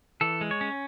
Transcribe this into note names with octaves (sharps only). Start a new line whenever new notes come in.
E3 A4
G#3
C#5
C#4